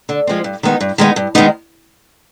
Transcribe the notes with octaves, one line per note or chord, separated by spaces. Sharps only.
D3
F3 G#3 C4
G2
D#3 G#3 B3 D#4
G2
D#3 G#3 B3 D#4
G2
D#3 G#3 B3 D#4